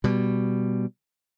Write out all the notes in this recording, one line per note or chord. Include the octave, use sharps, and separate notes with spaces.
B2 G3